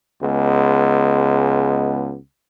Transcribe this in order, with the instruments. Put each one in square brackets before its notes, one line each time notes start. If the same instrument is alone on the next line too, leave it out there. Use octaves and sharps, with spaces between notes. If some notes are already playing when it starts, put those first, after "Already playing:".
[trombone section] C#2 G#3 B3